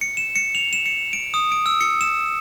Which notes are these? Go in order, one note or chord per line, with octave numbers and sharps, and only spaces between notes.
C#7
E7
C#7
F7
E7
C#7
D7
D#6
D7
E6
C#7
E7